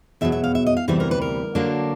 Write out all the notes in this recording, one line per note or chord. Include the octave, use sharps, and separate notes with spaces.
E2 B2 F#3 E5
E5
F5
E5
D#5
F5
D2 C3 E3 G3 E5
A#4
B4
A#4
D3 F#3 A#3 D4